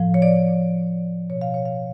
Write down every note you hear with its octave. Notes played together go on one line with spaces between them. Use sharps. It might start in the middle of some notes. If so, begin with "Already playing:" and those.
Already playing: A2 F3
C#5
D5
B2 C#5
F5
C#5
F5